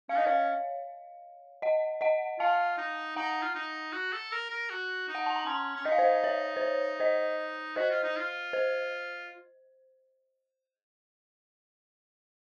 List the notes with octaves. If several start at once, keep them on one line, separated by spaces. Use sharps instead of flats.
C#4 F5
D#4 D#5
C#4 C#5 F5
D#5 F#5
D#5 F#5
F4 F5 A5
D#4
D#4 F#5 A#5
F4
D#4
F#4
A4
A#4
A#4
F#4
D#4
F#5
A5
A#5
C#4 A5 C6
C#4
D#4 D#5
F5
C5 D#5
C#5
C5
C#5
C5 D#5
F#4 C5 D#5
F4
D#4
F4
C5